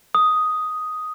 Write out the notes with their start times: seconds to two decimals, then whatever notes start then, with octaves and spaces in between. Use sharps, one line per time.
0.15 D#6